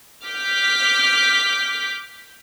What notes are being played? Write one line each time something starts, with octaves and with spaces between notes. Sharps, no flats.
D6 F6 G6 B6